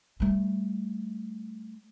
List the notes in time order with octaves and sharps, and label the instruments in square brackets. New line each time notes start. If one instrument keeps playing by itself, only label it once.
[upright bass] G3 A3